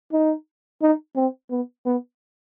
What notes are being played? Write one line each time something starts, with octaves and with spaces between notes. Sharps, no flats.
D#4
D#4
C4
B3
B3